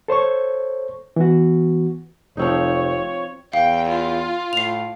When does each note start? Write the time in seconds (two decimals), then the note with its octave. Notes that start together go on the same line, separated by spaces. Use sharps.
0.08 A4 C5 C#5 C#6
1.16 E3 B3 F#4
2.37 F1 F3 C4 D#4 C#5
3.53 E2 F5 G5
3.90 F4
4.53 A2 C7 F7